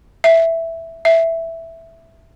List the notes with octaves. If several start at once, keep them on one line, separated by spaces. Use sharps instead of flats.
E5
E5